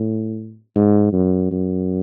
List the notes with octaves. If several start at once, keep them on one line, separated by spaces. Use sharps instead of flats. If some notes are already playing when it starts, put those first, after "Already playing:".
Already playing: A2
G#2
F#2
F#2